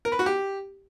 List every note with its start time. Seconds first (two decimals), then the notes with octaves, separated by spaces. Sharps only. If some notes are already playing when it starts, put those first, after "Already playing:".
0.05 A#4
0.12 B4
0.19 F#4
0.26 G4